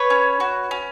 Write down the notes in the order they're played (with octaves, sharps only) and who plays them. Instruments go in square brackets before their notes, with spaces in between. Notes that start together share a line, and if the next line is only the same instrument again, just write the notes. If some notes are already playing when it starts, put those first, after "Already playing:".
Already playing: [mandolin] B4 C#5
C#4
F#4
C#4